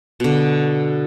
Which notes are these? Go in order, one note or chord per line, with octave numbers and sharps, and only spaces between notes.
B2 D3